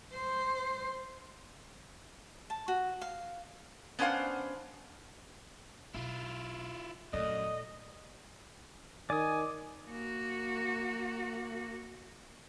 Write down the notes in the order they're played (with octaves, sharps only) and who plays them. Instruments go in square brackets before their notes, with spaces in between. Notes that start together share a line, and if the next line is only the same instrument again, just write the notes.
[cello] C5
[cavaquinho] A5
F#4
F5
[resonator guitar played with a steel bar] B3 C#4 D4 C5 F5 F#5
[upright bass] B1 [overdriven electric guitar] E4 F4
[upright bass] D#1 A3 [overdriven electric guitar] F#2 [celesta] A4 D5 D#6 [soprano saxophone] D#5
[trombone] D#3 [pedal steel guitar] D5 D#6 [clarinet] G#5
[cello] A#3 F#4